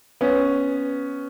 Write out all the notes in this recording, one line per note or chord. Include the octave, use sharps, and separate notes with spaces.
B3 C#4